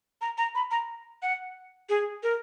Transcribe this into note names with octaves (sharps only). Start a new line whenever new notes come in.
A#5
A#5
B5
A#5
F#5
G#4
A#4